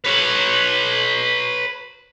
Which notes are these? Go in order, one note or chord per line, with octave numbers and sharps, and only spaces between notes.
B4 C#5